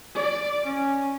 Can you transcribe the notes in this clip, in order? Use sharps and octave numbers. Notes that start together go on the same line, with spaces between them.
D5
C#4